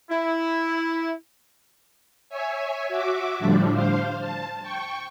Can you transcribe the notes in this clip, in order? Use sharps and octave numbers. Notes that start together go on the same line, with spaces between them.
E4
C#5 E5 G#5
F#4 E5 D6
A2 D3 F3 G3 D4
C5 F5
A5
G5 C#6